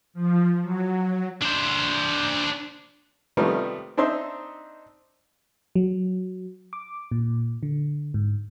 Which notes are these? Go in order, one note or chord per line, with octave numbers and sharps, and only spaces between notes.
F3
F#3
D4 C5
C3 D#3 F3 G3 A3 B3
C4 D4 D#4 C5 E5 C6
F#3
D6
A#2
D3
G#2